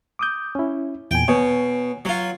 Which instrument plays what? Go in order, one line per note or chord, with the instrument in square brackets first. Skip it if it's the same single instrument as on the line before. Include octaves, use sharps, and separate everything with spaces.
[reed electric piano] D6 D#6 G6
C#4 E4
[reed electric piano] E2 A#2 G#5 [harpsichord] G5
[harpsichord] B2 [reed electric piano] C#5 G#5
[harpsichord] F#3 F4